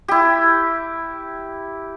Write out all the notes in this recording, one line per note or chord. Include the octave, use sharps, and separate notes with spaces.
E4 G4